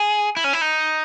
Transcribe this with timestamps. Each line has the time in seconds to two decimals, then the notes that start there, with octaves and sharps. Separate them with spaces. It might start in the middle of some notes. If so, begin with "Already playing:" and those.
Already playing: G#4
0.37 E4
0.44 C#4
0.53 E4
0.61 D#4